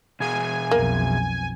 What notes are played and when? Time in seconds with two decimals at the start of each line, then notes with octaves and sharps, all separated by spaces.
0.20 B2 G#4 G#5
0.71 B1 F2 A#3